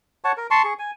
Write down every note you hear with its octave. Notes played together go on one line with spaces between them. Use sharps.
C#5 F#5 A5 C#6
A#4
A5 C6 C#6
G#4 C#6
G#5